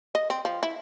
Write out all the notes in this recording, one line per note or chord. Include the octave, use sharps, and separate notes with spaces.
D#5
C4
F3
E4